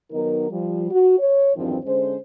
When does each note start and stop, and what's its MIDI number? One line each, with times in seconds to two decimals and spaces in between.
0.12 0.50 51
0.12 0.50 54
0.12 0.50 59
0.12 0.50 63
0.12 0.50 70
0.50 0.87 53
0.50 0.87 55
0.91 1.18 66
1.19 1.54 73
1.56 1.78 40
1.56 1.78 43
1.56 1.78 51
1.56 1.78 53
1.56 1.78 60
1.84 2.17 50
1.84 2.17 56
1.84 2.17 61
1.84 2.17 72